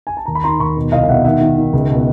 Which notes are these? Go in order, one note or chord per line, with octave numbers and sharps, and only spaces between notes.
G#5
A5
D#2 A#5
B5
D#3 A#5 C6
D#2 B5 C#6
B2
C2 D#5 F5
F5
B2 E5 F#5
D#3 E5 F#5
D#3
D#3
C#2
B2